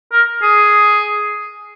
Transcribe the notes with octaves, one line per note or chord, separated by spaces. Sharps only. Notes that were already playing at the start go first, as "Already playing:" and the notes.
A#4
G#4